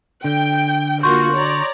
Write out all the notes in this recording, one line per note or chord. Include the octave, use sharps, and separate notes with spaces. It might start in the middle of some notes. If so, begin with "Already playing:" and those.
D3 G5
A#3 F4 F#4 C6 C#6 G6
C#5 D5 A#5